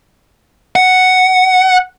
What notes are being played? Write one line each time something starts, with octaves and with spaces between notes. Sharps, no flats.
F#5